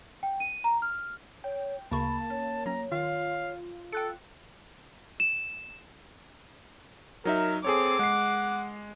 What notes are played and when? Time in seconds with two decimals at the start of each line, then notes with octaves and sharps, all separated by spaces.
0.23 G5
0.40 D#7
0.64 A#5
0.82 F6
1.44 C#5 G5
1.92 D2 C#3 A#3 A5 B5 C#6
2.30 C#4 C#5
2.66 F#3 C#4 A#5
2.92 D#3 F4 F5
3.93 A4 G5 F#6 C#7
5.20 E7
7.25 F#3 D#4 A#4 E5
7.65 C4 G#4 A4 C#5 D6
7.99 G#3 F#5 C7